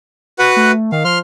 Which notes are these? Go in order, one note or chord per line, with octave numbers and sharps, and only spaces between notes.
F#4 B4 F#5
A3
D#3 F5
F3 C6 F6